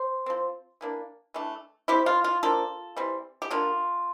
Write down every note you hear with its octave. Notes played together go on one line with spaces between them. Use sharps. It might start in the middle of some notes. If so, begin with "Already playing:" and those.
Already playing: C5
F3 C4
E3 A#3 D4
E3 A3 D4
C3 G3 C4 E4 G4
F4
F4
F3 A#3 D4 F4 A4
E3 G3 C4
G4
D3 G3 A#3 D4 F4